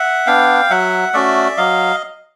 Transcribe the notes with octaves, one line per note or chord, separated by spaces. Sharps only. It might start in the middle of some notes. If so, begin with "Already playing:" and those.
Already playing: E5 F#5
B3 D4 F5 G5
F#3 E5 F#5
A3 C#4 F#4 D5 E5
F#3 D#5 F5